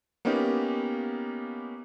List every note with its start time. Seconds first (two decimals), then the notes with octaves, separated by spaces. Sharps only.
0.25 A#3 B3 C#4 D#4 G4